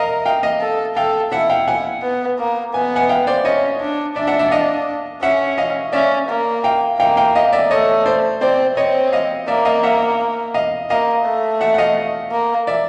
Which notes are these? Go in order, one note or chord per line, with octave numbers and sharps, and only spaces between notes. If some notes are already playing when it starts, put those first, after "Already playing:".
Already playing: A#4 D#5 F5
F5 G5
D#5 F5
A4
A4 F5 G5
E4 E5 F#5
F5 G5
F#5 G#5
B3
A#3
B3 G#5
F#5 G#5
F5 G5
C5 D5
C#4 C#5 D#5
D4
D4 D5 E5
E5 F#5
D5 E5
D#5 F5
C#4 E5 F#5
D#5 F5
C#4 D5 E5
A#3
F5 G5
A#3 F5 G5
F5 G5
D#5 F5
D5 E5
A3 C#5 D#5
C5 D5
C4 C5 D5
C4 C#5 D#5
D#5 F5
A#3 D5 E5
D#5 F5
E5 F#5
D#5 F5
A#3 D#5 F5
A3
E5 F#5
F#5
D#5 F5
A#3
D5 E5